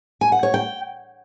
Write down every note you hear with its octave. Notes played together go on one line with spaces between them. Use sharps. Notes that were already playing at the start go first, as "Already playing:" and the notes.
G#5
F#5
C#5
G5